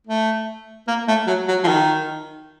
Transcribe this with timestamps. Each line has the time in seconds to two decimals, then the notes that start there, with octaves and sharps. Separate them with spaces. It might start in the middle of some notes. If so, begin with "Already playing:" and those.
0.07 A3
0.87 A#3
1.08 A3
1.27 F#3
1.48 F#3
1.64 F3
1.68 D#3